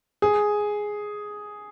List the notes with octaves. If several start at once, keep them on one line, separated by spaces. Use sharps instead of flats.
G#4